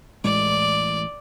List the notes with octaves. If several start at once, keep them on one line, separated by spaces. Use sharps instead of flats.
A1 A2 G#3 D5